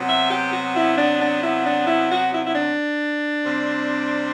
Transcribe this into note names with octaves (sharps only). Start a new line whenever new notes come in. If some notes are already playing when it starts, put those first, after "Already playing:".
Already playing: C3 F#3 B3
E5
G4
F#4
E4
D4
D4
E4
D4
E4
F#4
E4
E4
D4
C3 G3 C4